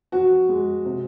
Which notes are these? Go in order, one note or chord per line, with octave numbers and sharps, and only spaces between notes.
F3 F#4
G#3
C3